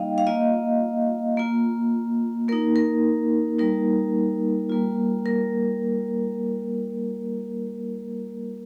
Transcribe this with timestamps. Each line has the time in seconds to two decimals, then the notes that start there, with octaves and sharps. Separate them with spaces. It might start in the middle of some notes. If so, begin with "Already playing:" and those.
Already playing: G3 A#3 D#4 D#5 F5 G5
0.18 F5
0.27 A#3 F4 D#5
1.37 A#3 F4
2.48 A#3 D#4 A#4
2.76 A#4
3.59 G3 A#3 D#4 A#4
4.70 G3 A#3 F4
5.26 A#4